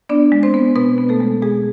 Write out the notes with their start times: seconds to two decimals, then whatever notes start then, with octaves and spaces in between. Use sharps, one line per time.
0.09 B3 D4 D5
0.32 G#3
0.43 C4 C5
0.54 B3
0.76 B2 B3 B4
0.98 B3
1.09 A3 A4
1.20 G#3
1.42 B2 G#3 G#4